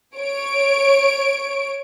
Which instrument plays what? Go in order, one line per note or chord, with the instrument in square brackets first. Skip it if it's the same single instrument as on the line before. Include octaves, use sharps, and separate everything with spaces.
[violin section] C#5 D7